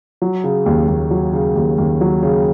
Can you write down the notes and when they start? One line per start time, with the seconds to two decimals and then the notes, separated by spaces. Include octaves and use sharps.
0.22 F#3
0.44 C#3
0.66 D#2
0.88 D#2
1.11 F#3
1.33 C#3
1.55 D#2
1.78 D#2
2.01 F#3
2.22 C#3